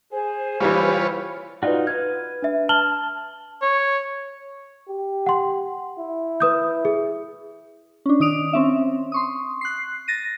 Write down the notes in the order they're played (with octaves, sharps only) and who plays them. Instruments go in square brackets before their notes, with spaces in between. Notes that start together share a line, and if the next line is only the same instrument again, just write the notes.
[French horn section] G#4 [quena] C5
[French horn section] C#3 G4 [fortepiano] E3 G3 [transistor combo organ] F4 B4 C#5
[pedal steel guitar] D#4 F4 F#4 [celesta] B4 D5
[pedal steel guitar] B4 F6 [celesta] G#6
[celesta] D4 E5
[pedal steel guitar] A5 [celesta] F6 F#7 G7
[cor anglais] C#5
[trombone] G4
[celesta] F#5 C6
[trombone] E4
[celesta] B4 D#6 G6
G#4
[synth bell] C#4 D4
D#3 D4 D#6 D7 F7
C4 C#4 E5
C6 C#6 D#6
F#6 C7
A6 A#6 D#7